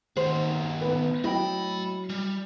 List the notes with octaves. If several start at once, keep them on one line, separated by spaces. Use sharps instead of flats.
D#2 D#3 F#4 C5
B3 B4
F#3 A3 E4 D#5 G5 B5
G3